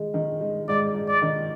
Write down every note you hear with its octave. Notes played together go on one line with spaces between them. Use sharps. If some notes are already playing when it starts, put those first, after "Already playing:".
Already playing: D#3 G#3
D#3
G#3
G#2 D5
G#2
D5
D#3